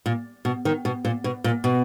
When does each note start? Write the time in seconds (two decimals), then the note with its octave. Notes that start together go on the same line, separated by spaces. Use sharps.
0.06 A#2
0.45 B2
0.65 D#3
0.85 B2
1.05 A#2
1.24 B2
1.44 A#2
1.64 B2